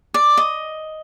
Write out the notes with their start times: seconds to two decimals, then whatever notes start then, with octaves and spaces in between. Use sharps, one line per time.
0.14 D5
0.37 D#5